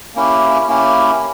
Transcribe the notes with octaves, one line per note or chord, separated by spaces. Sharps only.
A#3 C#4 E4 G4
A#3 C#4 E4 G4